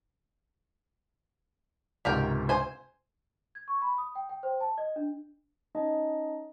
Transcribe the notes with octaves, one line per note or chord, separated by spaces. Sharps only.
C#2 G#2 C3 G4 A#4 G5
C5 G#5
G#6
C#6
B5
D#6
G5
G5
C5
A5
D#5
D4
C#4 D#4 D#5 A5